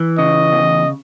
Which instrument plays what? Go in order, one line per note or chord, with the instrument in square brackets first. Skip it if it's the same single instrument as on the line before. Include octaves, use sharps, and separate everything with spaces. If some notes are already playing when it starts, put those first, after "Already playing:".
Already playing: [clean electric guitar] E3
[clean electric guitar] C#3 [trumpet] D#5
[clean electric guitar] E2